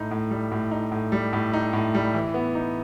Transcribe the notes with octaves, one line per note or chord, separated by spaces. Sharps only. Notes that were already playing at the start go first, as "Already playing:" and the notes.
Already playing: A2 D#4
A2
G3
A2
D#4
A2
G3
A2
D#4
A2
G3
E3
B3
D#4